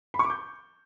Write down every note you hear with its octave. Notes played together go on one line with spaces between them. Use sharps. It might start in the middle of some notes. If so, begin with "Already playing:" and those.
B5
C#6
D6
G6